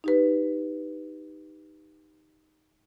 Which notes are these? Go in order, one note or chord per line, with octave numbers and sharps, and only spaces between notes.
D#4 G4 B4